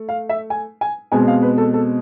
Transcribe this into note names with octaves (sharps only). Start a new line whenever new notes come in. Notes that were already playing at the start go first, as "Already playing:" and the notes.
Already playing: A3
F5
E5
G#5
G#5
B2 G#3 C4 G#5
F5
B4
A4
A4